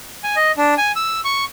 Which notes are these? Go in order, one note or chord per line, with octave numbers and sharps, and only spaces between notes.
G#5
D#5
D4
G#5
E6
C#6